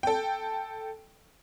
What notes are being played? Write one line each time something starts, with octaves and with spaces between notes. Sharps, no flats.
A4 G5